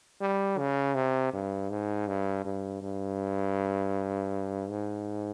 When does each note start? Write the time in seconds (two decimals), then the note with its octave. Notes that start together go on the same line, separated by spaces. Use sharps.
0.21 G3
0.58 C#3
0.95 C3
1.33 G2
1.70 G#2
2.08 G2
2.45 G2
2.82 G2
4.70 G#2